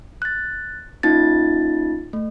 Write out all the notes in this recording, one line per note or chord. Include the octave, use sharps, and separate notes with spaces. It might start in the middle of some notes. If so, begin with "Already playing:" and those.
F#6 A6
A#3 C#4 D#4 F4 A6
A3